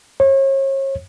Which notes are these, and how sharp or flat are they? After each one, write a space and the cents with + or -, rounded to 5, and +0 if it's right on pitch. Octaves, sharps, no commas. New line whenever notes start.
C#5 -35